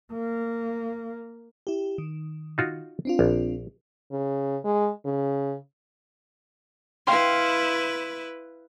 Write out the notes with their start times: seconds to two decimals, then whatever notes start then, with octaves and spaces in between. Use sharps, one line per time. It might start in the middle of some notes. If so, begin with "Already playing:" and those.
0.13 A#3
1.67 E4 G4
1.98 D#3
2.58 D#4 F4 F#4
3.05 C4 D4 F4
3.19 A#1
4.12 C#3
4.64 G#3
5.05 C#3
7.07 E4 B4 F5 G5 C6